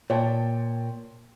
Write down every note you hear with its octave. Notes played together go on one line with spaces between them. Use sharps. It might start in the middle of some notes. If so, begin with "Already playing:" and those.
A#2 C#5 G5 A5